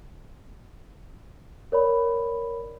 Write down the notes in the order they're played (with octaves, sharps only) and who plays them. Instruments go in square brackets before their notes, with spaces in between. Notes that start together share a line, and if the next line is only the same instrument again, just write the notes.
[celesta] A#4 C#5 D5 B5